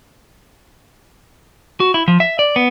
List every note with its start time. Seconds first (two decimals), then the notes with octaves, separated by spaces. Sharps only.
1.80 F#4
1.94 E4
2.08 F3
2.20 E5
2.39 D5
2.56 B3